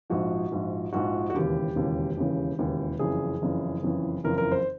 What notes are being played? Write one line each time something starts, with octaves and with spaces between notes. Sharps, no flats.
A#1 G#2 F3 F#4
A#1 G#2 F3
A#1 G#2 F3 F#4
F#4
E1 D#2 C#3 E3 G4
E1 D#2 C#3 E3
E1 D#2 C#3 E3
E1 D#2 C#3 E3
F#1 F2 C#3 E3 G#4
F#1 F2 C#3 E3
F#1 F2 C#3 E3
F#1 F2 C#3 E3 A#4
A#4
C5